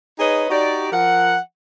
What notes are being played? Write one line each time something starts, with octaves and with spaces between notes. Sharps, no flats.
D#4 G#4 B4 C#5 D#5
D#4 F#4 G4 D5
F3 A#4 F#5